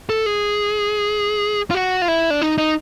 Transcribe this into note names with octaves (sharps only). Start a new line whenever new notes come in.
A4
G#4
F4
F#4
F4
E4
D4
D#4
D#4